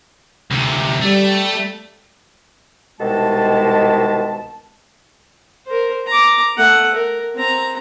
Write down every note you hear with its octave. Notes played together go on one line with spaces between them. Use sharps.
D2 C3
G3 A3
C2 B2 D#3 G#3 A5
A#4 C5
A#5 D6
A3 F#5
A#4
C4 A#5